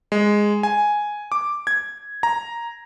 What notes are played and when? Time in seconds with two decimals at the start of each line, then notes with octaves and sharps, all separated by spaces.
0.12 G#3
0.63 G#5
1.32 D6
1.67 G#6
2.23 A#5